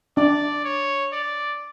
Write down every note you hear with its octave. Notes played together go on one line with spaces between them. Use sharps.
D4 D5
C#5
D5